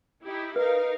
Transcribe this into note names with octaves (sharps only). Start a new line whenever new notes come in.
D#4 E4 G4
D#4 A#4 B4 F5